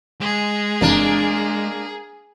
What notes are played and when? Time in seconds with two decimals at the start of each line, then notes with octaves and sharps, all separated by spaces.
0.21 G#3 G#4
0.81 G1 C3 E3 A#3 D4